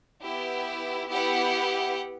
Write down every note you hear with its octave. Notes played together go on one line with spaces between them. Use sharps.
B3 E4 G4
B3 E4 G4 B4 F#5